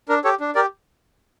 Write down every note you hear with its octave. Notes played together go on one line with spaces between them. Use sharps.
D4 A#4
G4 A4 C#5
D4
G4 A#4 D5